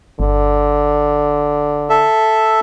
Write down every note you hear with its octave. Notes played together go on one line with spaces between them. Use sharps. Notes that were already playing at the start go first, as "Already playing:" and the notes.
G1 D3
A4 E5